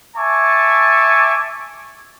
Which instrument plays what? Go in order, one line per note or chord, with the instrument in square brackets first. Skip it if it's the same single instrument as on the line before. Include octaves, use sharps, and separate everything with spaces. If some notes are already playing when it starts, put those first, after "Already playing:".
[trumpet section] E5 G#5 A5 C#6 D6